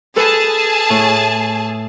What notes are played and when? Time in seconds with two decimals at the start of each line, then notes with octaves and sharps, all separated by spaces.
0.16 G#4 A4 B4 A5
0.90 A2